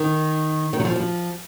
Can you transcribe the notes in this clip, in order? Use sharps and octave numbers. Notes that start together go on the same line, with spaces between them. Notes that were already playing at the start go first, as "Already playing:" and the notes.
Already playing: D#3
D#3
F#3
F3
F3